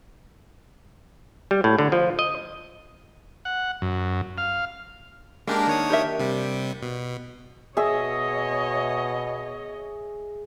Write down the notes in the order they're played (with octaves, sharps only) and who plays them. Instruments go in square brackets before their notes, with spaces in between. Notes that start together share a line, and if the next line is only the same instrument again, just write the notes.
[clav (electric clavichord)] G3
A2
D3
F3
D#5
[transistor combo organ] F#5
F#2
F5
[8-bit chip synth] G#3 G4 A#4 [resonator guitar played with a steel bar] A#3 D4
[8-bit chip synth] D#3 C#5 D#6
[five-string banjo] G4 A#4 E5
[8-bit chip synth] C3 G3
B2
[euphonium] B2 [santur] G#4 E5 [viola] C#5 D#5